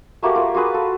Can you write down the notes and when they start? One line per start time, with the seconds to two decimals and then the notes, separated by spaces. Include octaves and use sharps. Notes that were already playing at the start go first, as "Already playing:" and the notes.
0.22 A3 A#3 F#4 G4
0.35 F4 A#4
0.54 F4 F#4 G#4 B4
0.74 A4